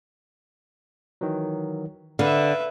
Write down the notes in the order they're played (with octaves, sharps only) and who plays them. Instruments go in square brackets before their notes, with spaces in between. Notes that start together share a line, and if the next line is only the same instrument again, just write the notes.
[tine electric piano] D#3 E3 F#3
[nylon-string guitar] D3 [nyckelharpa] B4 E5 [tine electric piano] F5